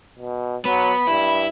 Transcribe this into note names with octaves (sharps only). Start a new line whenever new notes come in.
B2
F#3 B3 B5
G2 E4